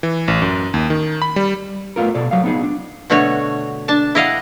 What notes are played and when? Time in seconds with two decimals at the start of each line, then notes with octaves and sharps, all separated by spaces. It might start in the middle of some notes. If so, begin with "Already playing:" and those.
0.03 E3
0.28 A1
0.42 F#2
0.74 D#2
0.90 D#3
1.22 B5
1.36 G3
1.96 A3 B3 F4 A#4
2.15 B2 A4 D5
2.31 F#3 F5
2.44 B3 D#4 G#4
2.63 D4
3.10 B2 D3 A3 F#4 C#5
3.88 D4 A5
4.15 E4 D#5 F5 F#5